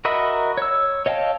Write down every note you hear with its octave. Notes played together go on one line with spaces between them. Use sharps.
F#4 A#4 D#5 E5 B5
C#5 E6
C#5 D#5 F5 G5 A5